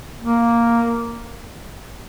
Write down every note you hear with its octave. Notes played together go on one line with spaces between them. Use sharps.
A#3